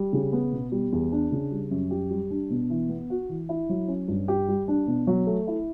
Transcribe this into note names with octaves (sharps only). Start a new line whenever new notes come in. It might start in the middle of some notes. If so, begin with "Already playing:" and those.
Already playing: G3
C#3
B3
B2
G3
E2
D4
C#3
G3
F#2
G4
G3
D4
B2
E3
B3
F#4
E3
E4
F#3
C#4
G2
G4
G3
D4
B2
F#3
A3
E4